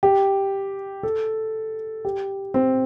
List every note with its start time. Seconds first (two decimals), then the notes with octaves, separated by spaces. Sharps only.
0.03 G4
1.03 A4
2.05 G4
2.54 C4